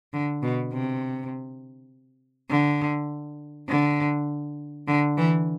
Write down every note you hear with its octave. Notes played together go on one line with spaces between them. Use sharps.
D3
B2
C3
D3
D3
D3
E3